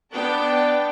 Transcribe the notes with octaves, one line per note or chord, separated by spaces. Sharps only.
B3 D4 D5 G5 A5